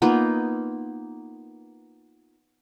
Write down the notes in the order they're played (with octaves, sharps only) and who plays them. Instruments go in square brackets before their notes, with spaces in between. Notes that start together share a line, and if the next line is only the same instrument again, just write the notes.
[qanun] A#3 B3 D#4 F4